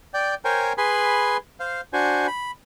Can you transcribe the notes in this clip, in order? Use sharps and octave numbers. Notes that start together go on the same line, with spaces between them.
D5 G5
A#4 C5 C#5 G5 G#5
G#4 B4 G#5 B5 C6
C5 F5
D4 F#4 C5 G#5
B5